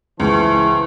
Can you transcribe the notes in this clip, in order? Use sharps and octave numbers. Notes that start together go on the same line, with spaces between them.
C#2 E3 C5 A5 C#6